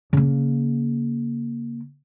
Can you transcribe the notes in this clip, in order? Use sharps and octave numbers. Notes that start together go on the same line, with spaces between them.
C#3 A#3